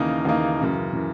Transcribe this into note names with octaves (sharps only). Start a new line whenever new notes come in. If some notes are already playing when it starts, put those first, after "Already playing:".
Already playing: D#2 C#3 E3 A#3 D#4
D#2 C#3 E3 A#3 D#4
F#2 C#3 E3
C#3 E3